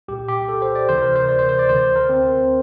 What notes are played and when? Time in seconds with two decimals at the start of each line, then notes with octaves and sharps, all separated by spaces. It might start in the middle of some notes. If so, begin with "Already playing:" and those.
0.08 C2 A#2 G4
0.28 G4
0.48 A4
0.62 C5
0.75 D5
0.89 D2 C3 E3 C5
1.02 A#4
1.16 C5
1.29 D5
1.39 C5
1.49 C5
1.59 D5
1.69 D2 D3 C5
1.96 A#4
2.09 C4